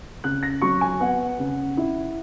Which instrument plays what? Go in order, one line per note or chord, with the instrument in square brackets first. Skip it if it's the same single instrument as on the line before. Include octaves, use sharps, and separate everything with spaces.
[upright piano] C#3 F#6
A#6
F#3 C#6
G#5
B3 F#5
C#3
E4